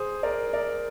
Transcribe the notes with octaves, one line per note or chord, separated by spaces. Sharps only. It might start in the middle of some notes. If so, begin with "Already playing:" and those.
Already playing: G#4 C5
A#4 D5
A#4 D5